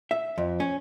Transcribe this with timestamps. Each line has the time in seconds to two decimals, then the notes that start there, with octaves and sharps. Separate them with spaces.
0.11 E5
0.38 F2
0.60 C#4